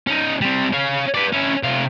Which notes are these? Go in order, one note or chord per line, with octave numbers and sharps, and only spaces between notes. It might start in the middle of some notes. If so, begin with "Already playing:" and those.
C#4 D#4
G3 C4
C#4 F5
B4 D5
C#4 E4
C3 F5